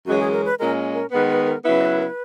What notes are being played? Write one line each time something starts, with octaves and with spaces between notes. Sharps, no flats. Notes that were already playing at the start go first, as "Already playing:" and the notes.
F#2 E3 G#3 C#4 F#4
G#4
A#4
B4
A#2 G#3 C#4 A#4
A#4
D#3 G#3 B3 B4
B4
A#4
C#3 F#3 B3 E4 B4
D#5
B4
A#4
B4